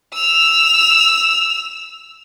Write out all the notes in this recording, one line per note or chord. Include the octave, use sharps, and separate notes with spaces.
E6 F7